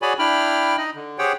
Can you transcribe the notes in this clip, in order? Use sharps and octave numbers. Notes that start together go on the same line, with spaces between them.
F#4 G#4 C#5 D5 G#5 B5
D4 E4 G5 B5 F6
D#4 D#5
D3
G4 G#4 C5 C#5 F#5 G5